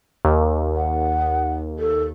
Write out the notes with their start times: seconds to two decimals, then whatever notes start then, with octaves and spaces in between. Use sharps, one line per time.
0.25 D#2
0.76 F#5
1.79 A4